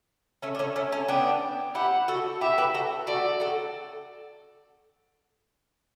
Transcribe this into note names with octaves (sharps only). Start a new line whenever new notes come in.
A3 C#4
D4
A3 C#4
A3 C#4
A3 C#4
B3 D4 G5
E4 G4 F#5
F#4 A4
E4 G4 E5
G4 B4
F#4 A4
F#4 A4 D5
F#4 A4